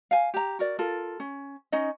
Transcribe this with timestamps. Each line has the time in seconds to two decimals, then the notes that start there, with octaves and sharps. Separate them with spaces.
0.11 F5 G#5
0.34 G4 A#5
0.59 F#4 A#4 D5
0.79 F4 A4 A#4
1.20 C#4
1.72 C#4 D#4 D#5